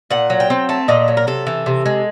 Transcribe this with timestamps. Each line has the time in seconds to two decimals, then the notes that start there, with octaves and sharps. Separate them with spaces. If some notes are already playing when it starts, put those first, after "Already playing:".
0.11 A#2 F#5
0.30 F#3
0.40 G5
0.50 C4
0.69 A3 A5
0.88 A#2 D#5
1.08 F#3
1.17 A#4
1.27 C3 A4
1.47 E3
1.66 C3
1.86 G#3